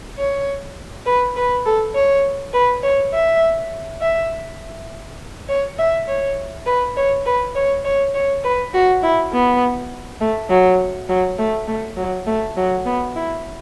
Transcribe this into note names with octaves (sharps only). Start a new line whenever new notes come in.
C#5
B4
B4
A4
C#5
B4
C#5
E5
E5
C#5
E5
C#5
B4
C#5
B4
C#5
C#5
C#5
B4
F#4
E4
B3
A3
F#3
F#3
A3
A3
F#3
A3
F#3
B3
E4